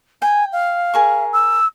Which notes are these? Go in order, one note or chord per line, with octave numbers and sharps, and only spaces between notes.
G5 G#5
F5
G#4 A#4 C#6
E6